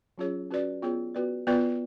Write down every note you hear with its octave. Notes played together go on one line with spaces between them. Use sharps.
F#3 C#4 F4 G#4 C#5
C#4 F#4 B4 D5
B3 F4 G#4 C#5
B3 F#4 B4 D5
B3 F4 B4 D5